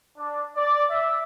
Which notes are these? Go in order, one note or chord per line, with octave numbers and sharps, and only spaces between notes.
D4
D5
E5